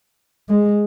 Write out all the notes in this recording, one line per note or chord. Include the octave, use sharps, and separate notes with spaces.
G#3